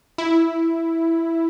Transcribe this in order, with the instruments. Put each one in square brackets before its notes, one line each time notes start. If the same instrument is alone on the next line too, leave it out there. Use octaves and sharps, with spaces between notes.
[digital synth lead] E4